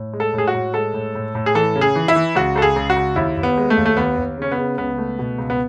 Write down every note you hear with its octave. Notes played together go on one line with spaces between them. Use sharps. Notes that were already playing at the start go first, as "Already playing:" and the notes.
Already playing: A2
G#3
A4
A2 G#4
F#4
A2
G#3 A4
A2
A2
A2
G#4
E3 A4
C#3
G#4
E3
E4
E3
C#2 F#4
C#2 A4
G#4
C#2
F#4
C#2
D#2 E4
D#2
B3
G#3
A3
D#2
A3
D#2 B3
D#2
C#3 C#4
B3
C#3
C#2 B3
A3
B2
C#2
B3